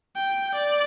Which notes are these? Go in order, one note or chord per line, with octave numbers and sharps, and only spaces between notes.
G5
D5